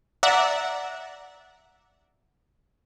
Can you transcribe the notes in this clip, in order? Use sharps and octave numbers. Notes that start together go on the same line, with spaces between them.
D5 E5 F#5 A#5